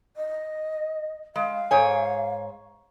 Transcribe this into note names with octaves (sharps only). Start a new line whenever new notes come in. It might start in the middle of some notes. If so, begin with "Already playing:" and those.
D#5
G#3 F5
G#2 C#5 G#5